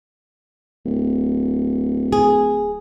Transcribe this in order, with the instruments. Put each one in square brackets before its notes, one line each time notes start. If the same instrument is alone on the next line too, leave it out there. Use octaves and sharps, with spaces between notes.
[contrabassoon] D1
[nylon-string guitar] G#4